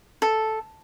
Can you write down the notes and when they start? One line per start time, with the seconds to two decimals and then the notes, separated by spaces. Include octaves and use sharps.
0.22 A4